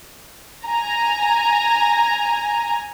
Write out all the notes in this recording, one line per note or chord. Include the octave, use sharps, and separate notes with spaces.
G#5 A#5